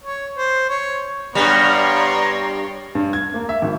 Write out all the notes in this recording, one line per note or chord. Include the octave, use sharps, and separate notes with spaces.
C#5
C5
C#5
G2 G3 B3 C#5 D5 A#5 C6
G2
G#6
A#3
E5
G#1